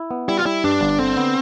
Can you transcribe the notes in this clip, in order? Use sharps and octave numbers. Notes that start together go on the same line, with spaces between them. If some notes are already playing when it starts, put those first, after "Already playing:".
Already playing: E4
B3
G3 E4
F4
G3 E4
G2 D4
G1
D3 C4
B3